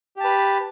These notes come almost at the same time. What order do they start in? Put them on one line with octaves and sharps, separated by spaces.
G4 A5 B4